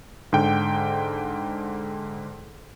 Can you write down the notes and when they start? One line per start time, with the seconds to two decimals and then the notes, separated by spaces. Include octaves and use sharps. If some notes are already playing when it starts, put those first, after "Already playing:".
0.33 G#2 D3 G5